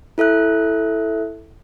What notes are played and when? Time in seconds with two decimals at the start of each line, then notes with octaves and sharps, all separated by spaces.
0.18 E4 A4 E5 F#6